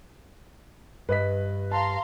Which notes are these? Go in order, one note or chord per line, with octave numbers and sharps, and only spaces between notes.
G2 B4 D#5 B6
F5 A5 A#5 C6